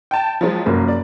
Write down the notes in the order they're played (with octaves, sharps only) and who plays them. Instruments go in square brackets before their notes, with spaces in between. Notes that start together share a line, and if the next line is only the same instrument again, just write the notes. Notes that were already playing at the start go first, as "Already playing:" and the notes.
[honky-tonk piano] G5 A5
F3 F#3 G#3
[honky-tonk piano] F1 [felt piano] F#2 A#3
[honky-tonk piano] A#4 D5